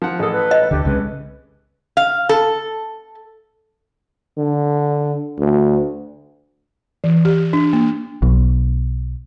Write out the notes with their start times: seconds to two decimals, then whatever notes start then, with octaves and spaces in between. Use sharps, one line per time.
0.02 F3 F#5
0.19 A1 G#4 A4
0.32 B4
0.51 D#5
0.71 D2 D3 G4
0.85 C2 C#3 G#3 B4
1.97 F5
2.29 A4
4.38 D3
5.39 D2
7.04 E3
7.25 G4
7.53 D4
7.73 A#3
8.22 B1